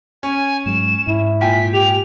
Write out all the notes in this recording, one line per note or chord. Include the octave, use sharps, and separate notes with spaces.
C#4 G#5
G#2 F#3 G#3 E7
G#2 E4
A#2 G5 G#5 B6
G4 F7